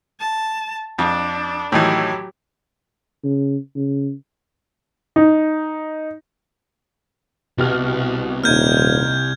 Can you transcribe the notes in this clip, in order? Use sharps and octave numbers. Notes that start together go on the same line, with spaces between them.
A5
F2 D4
A2 D#3 E3 F#3 G4
C#3
C#3
D#4
C2 B2 G4 F6
D#1 A#3 D#4 F6 G6 G#6